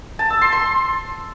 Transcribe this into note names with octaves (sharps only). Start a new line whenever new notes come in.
A5
E6
C6
C6